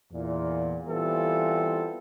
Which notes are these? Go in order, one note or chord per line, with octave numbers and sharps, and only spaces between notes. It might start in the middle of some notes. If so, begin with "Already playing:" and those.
E2 A#2
E3 G3 B3 C4 F4 A4